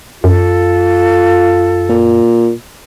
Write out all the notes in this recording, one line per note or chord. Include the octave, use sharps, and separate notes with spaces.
F#2 F4 A4
A#2